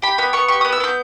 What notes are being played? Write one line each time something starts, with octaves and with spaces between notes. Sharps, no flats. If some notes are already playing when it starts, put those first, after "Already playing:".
G4 B5
B3 B5
B3 C#6
G4 C#6
B3 D#6
E6
B3 G6